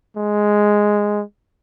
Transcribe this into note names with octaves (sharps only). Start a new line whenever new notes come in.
G#3